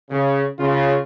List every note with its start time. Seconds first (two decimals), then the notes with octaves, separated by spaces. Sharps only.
0.10 C#3
0.59 C#3 F4